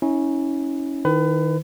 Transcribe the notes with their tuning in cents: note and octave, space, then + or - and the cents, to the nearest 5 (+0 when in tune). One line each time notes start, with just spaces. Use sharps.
C#4 +0 E4 -40
D#3 +0 E4 +15 B4 +30